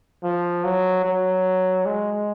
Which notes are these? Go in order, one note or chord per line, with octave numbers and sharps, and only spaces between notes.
F3
F#3
F#3
G#3